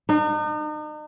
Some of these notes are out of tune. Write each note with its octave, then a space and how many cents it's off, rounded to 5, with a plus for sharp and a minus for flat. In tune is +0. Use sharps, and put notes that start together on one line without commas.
D#4 -40